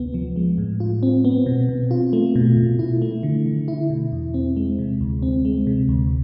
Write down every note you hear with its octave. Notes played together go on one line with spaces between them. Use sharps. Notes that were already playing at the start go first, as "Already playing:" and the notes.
Already playing: D2 C3 B3
F3
G#3
A2
F4
C4
B3
B2
B2
F4
A3
B2
B2
E4
A3
D3
D3
E4
B2
E2
C4
G#3
C3
D2
C4
G#3
C3
D2